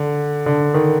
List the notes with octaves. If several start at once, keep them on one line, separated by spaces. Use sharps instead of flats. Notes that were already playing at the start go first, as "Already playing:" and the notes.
Already playing: D3
D3
D#3